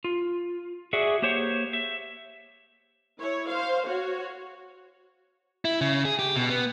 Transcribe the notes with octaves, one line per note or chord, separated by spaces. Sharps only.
F4
F#4 G#4 D5 E5 F#5
A#3 G4 C5 C#5 F#5
E5
E4 C#5
C5 F5
F#4 C#5
E4
C#3
G#4
G4
B2
B3